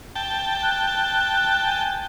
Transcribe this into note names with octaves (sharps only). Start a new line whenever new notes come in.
G5 A5
F#6
G#5